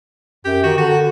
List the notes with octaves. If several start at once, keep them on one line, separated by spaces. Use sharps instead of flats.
F#2 G4
D#3 F#4
D3 F#4